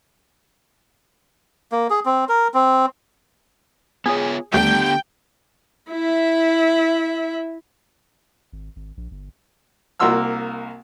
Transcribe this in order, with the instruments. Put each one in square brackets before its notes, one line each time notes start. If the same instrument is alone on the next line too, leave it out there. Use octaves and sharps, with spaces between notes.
[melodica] A#3
G#4
C4
A#4
C4
[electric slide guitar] B3 F4 C#5 [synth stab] G#4
[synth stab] D#2 G3 A3 [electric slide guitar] D3 B3 G4 [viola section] G5
[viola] E4 E5
[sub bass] G#1
G#1
A#1
G1
[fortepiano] C2 A#3 F#4 C6 E6 F6